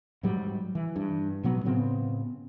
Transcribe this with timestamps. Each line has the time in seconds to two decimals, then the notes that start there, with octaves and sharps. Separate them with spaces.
0.23 G#2 F#3 G3
0.75 E3
0.96 G2
1.43 A1 B2 F#3 B3
1.65 A2 C#3 B3 C4